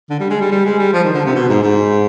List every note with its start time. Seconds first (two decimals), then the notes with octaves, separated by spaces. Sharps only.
0.10 D3
0.20 G3
0.30 G#3
0.41 G3
0.51 G3
0.65 G#3
0.79 G3
0.93 F3
1.04 D#3
1.14 D3
1.25 C3
1.35 B2
1.49 G#2
1.63 G#2